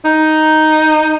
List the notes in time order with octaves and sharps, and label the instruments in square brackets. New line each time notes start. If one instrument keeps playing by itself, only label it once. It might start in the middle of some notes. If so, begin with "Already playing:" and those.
[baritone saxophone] D#4